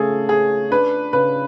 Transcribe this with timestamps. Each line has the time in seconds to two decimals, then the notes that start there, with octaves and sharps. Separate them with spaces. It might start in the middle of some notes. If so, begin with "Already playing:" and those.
Already playing: C#3 A3 G#4 A4
0.29 C#4 G#4
0.71 D4 B4
1.13 C#3 B4